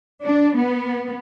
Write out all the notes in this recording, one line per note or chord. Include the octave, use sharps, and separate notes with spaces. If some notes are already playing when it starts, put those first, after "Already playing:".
D4
B3